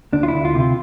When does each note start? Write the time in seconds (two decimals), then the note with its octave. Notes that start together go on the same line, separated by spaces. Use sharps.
0.13 D2 D4
0.23 F4
0.28 E4
0.34 D2
0.45 F4
0.55 C3 F4